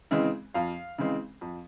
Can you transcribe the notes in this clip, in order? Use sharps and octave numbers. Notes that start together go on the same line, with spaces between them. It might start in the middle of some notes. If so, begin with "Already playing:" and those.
C#3 E3 G#3 C4
F2 F5
C#3 E3 G#3 C4
F2